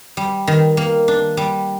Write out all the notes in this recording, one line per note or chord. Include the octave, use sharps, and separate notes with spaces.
G3
D#3
A#3
D4
G3